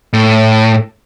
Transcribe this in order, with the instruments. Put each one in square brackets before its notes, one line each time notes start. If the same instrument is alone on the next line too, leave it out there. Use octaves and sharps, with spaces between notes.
[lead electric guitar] A2